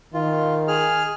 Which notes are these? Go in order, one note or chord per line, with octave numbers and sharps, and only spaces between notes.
D#3 F4
G#4 F6